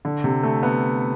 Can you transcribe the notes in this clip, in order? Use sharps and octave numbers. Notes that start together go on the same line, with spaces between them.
D3
C3
A3
B3